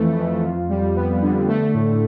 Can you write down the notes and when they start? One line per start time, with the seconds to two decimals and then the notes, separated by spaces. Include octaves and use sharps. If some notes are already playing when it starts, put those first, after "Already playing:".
Already playing: F2 E3 A3
0.17 F2
0.43 F4
0.70 G3
0.95 B3
1.22 D3
1.48 A3
1.74 A2